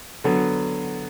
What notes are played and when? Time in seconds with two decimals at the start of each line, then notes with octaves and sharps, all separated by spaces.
0.24 D3 F#3 B3